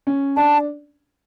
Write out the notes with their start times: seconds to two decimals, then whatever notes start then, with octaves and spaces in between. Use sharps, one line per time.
0.07 C#4
0.37 D4 A5